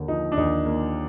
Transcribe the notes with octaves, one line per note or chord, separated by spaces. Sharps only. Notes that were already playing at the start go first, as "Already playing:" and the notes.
Already playing: D#2 D3 A#3
F3 D#4
D4
D#2 D#4
A#3